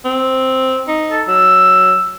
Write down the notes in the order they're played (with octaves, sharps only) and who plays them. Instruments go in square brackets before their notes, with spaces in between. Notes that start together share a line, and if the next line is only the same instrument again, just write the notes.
[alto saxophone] C4
D#4
[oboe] A4
[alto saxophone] F#3 [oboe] E6